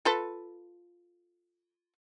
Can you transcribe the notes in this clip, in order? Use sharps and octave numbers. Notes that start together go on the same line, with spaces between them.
F4 A4 B4